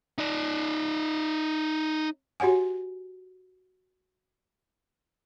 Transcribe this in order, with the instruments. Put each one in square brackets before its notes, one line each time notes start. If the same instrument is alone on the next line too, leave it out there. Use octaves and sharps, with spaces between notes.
[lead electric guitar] D#4 D5
[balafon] F#4 G4 C#5 F#5 G#5